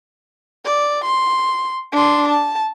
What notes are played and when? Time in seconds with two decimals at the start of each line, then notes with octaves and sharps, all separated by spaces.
0.65 D5
1.04 C6
1.93 D4 C6
2.28 A5